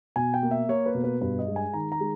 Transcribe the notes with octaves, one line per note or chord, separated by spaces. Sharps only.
B2 G#5
G5
A#3
E5
A#3 C#5
B4
B2
B4
G2 B4
D#5
G#3
G#5
D#3 A#5
A#5
G#3